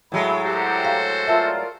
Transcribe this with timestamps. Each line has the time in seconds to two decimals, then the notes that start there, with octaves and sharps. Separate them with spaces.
0.12 A2 F#3 G#3 B5
0.44 F#4 G4 A4 C5 A#5
0.85 F5
1.27 F4 A#4 D5 E5 A5 E6